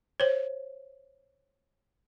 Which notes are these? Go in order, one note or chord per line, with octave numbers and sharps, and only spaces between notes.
C5 C#5